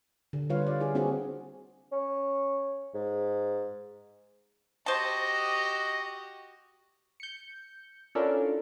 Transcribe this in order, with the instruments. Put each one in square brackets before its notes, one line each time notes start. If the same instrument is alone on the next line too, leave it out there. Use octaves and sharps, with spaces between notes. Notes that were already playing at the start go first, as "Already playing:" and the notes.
[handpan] D3
G3 F4 B4 C#5 F5
D5
E4 G#4 D5
A#3 C4 D4 F#4 G#4
[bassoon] C#4
G#2
[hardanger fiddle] F#4 G4 [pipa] C5 A5 [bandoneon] D#5
[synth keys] G6 C#7
C#4 D4 E4 F4 A4 A#4